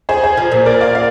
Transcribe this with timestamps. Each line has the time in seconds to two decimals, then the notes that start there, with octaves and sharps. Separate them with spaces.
0.09 G#4 C5
0.24 G#4 C5
0.37 F3
0.52 A#2
0.66 A#4 D5
0.81 D5 F5
0.95 D5 F5